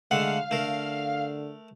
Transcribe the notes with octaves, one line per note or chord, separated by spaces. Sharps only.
D3 G#3 A3 F5 F#5
D3 A3 A#4